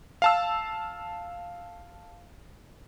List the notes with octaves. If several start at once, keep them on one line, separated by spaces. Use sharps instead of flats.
F5 A5 E6